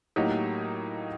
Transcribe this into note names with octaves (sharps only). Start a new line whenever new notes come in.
A2 F#3 A#3 D#4 G4